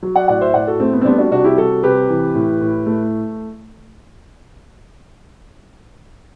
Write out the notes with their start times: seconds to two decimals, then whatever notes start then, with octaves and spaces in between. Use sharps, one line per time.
0.03 F#3
0.16 D5 F#5
0.28 A2 D5 F#5
0.41 C5 E5
0.54 A2 D5 F#5
0.67 F#4 A4
0.80 A3 C4
0.93 B3
1.01 C4
1.05 G3 B3 D4
1.18 D4 F#4
1.31 C3 D4 F#4
1.44 E4 G4
1.57 G3 F#4 A4
1.83 C3 G4 B4
2.09 E3
2.35 A2
2.61 A2
2.86 A3